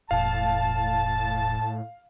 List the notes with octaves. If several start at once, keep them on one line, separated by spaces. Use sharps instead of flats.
E1 A2 F5 A5